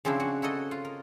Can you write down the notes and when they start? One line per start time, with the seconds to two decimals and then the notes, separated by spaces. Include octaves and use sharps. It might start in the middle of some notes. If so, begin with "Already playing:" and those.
0.05 C#3 F3 C4 D4 E4
0.20 F#4
0.42 E4 F#4 A4 D#5
0.71 F4
0.85 A#4